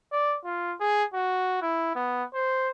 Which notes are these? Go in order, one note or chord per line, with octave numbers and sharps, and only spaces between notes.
D5
F4
G#4
F#4
E4
B3
C5